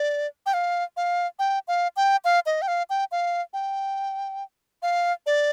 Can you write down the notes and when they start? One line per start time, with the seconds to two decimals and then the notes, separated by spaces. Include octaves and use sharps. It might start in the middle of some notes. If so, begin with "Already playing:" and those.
Already playing: D5
0.46 G5
0.54 F5
0.97 F5
1.39 G5
1.68 F5
1.96 G5
2.25 F5
2.46 D#5
2.62 G5
2.68 F5
2.90 G5
3.12 F5
3.53 G5
4.82 F5
5.26 D5